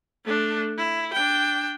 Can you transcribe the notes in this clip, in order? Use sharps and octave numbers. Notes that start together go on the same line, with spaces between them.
A3 D4
E4
D4 G5